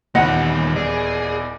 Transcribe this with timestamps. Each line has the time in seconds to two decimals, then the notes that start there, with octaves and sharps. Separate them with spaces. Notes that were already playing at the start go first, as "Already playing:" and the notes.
0.15 D#1 E2 D#3 G3 D#5 F#5
0.76 G#4 D5